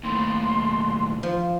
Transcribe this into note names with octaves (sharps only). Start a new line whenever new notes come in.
D#2 A2 C6
F3